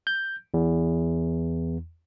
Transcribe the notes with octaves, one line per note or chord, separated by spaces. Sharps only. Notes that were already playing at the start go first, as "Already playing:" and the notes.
G6
E2